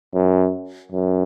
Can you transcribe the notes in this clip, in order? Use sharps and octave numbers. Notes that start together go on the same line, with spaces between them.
F#2
F#2